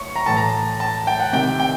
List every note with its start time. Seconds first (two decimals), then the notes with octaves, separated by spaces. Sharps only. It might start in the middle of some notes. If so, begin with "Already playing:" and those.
Already playing: C#6
0.16 A#5
0.26 A2 E3 A5
0.37 A#5
0.80 A5
1.07 G5
1.20 F#5
1.33 C3 D#3 G5
1.60 G5